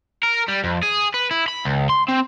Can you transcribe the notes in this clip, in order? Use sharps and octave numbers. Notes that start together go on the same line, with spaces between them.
A#4
G3
F2
G#4
B4
E4
B5
C#2
C6
C4